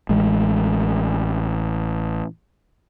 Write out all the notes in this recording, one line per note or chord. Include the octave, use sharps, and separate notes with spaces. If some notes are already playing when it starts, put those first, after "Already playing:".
A1 G#3